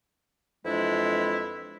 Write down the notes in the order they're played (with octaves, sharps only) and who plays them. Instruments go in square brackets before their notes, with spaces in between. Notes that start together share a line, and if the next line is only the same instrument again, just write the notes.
[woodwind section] F2 E3 G#3 D4 E4